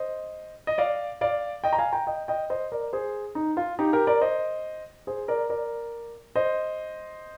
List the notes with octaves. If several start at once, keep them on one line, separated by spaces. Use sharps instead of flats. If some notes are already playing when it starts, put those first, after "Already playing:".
Already playing: C5 D#5
D#5
D5 F5
D5 F5
D#5 G5
A#5
F5 G#5
G5 A#5
D#5 G5
D#5 G5
C5 D#5
A#4 D5
G#4 C5
D#4
F4
D#4 G4
G4 A#4
A#4 D5
C5 D#5
G#4 C5
A#4 D5
A#4 D5
C5 D#5